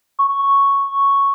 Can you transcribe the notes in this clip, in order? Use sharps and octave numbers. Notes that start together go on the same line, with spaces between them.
C#6